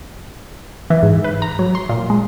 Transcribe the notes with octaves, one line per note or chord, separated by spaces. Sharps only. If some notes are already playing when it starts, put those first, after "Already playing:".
E3
G#2
B4
A#5
F#3
C6
A#2
G#3